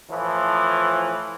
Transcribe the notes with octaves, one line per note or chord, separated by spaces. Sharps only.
A2 E3 F3